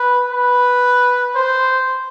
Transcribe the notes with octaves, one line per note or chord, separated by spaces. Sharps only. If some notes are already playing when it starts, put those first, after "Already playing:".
Already playing: B4
B4
C5